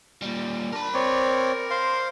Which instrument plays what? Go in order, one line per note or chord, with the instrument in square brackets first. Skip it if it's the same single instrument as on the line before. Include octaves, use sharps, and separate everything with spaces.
[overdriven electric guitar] A#2 G3
[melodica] D4 [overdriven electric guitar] A#4 B5
[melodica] C4 C#5 D5
C5 F5 C6